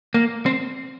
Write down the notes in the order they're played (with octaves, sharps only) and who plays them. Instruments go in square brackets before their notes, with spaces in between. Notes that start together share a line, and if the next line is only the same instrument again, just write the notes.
[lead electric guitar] A#3
C4